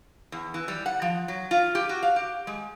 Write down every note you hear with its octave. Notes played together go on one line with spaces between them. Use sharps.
E2
E3
G3
F#5
F3
F#3
F4
G4
F#4
F5
G4
G#3